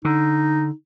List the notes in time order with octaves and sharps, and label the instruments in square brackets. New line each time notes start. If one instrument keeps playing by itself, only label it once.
[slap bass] D3 [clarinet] D#4